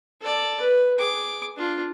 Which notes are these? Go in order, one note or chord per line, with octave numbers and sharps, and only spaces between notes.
A4 D5
B4
G#4 D6
D4 F4